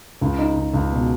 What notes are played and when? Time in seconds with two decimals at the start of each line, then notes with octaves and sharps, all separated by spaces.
0.21 C#2
0.39 D#4
0.56 C#2
0.74 C#2
0.92 B2